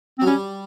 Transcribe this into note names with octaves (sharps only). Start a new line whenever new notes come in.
C4
F#3
G3 C#4